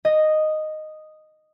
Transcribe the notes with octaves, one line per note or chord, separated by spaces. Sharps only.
D#5